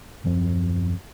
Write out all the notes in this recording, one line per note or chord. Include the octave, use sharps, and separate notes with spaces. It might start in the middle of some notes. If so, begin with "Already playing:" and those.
D#1 F#2 F3 C4